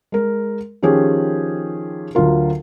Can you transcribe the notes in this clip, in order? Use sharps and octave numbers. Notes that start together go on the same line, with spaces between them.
G#3 A#4
D#3 F3 C#4 G4 G#4
D2 F#3 F4 A#4